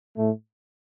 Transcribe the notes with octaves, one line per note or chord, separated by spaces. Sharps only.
A2 A3